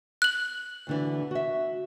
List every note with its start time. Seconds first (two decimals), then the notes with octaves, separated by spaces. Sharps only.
0.22 F#6 F#7
0.87 D2 D3 E3
1.31 F#4 E5